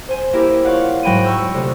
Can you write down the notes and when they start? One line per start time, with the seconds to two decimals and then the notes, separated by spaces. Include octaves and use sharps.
0.08 C5 G#5
0.33 A#3 E4 G4 A#4
0.65 F4 C#5 D5 F5 F#5
1.03 G#2 F#3 G5 B5 D#7
1.23 C#6 E6 G6
1.54 D2 C3